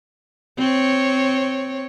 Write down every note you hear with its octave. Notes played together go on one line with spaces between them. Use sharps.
C4 C#5